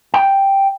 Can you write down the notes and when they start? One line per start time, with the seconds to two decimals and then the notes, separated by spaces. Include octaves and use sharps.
0.14 G5